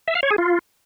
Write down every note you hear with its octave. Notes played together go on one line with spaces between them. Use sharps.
E5
F5
C#5
G#4
F4